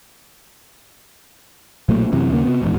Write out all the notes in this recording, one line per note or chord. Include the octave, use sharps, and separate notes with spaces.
B1 A#2 F#3 A3
F#2 C3 E3
D#2 C#3 A#3
C3 B3
D#1 E2 G#2